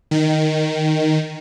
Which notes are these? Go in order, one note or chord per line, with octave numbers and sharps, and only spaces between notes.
D#3